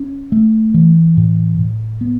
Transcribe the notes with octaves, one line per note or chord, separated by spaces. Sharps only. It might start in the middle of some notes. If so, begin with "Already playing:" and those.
Already playing: C#4
A3
E3
A2
A2
B3